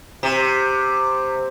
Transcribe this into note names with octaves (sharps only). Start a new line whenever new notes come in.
C3